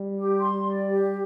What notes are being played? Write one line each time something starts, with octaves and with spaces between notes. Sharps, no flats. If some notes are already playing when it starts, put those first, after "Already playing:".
Already playing: G3
G4
C6
D5
G4